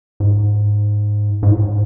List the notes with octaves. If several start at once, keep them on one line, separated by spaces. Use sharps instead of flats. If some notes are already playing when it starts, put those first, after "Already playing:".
G#2
G#2
A2
G#2